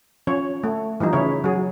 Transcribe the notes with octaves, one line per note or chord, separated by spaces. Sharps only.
F3 C#4 C#5
A3
E3 F3 G3 D#4
C#3 C#4 E4 C#5
F#3 G#4